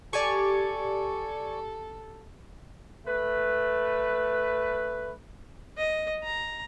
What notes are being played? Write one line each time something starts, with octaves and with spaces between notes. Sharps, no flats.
G4 A4 D5 G#5 C#6
A3 B4
D#5
A#5